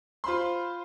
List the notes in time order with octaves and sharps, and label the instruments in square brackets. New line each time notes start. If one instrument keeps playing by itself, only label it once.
[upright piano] F4 C5 B5 C6